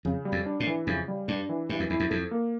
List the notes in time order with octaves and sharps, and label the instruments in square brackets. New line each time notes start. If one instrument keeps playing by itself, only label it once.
[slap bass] F2 [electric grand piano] C#3
[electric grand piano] G3
[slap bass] F2
[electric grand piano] D4
[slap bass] A2
[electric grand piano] E3
[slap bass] F2 [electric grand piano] C#3
[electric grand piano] G3
[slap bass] G2 [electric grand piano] D4
[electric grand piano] E3
[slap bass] G2 [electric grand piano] E3
[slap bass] F2
[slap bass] E2 [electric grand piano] E4
[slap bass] F2
[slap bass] F2 [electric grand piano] A4
[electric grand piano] A#3